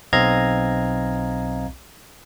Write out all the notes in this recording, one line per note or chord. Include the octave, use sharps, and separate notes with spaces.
B1 C4 D#5 F5 A#5 G#6